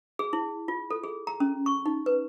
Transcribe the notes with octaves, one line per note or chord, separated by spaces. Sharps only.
G#4
E4
F4
A4
G#4
A#5
C#4
C#6
D#4
B4